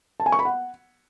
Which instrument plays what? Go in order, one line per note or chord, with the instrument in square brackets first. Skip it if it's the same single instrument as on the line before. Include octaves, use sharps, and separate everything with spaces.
[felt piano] A5
G#5
C#6
B5
F#5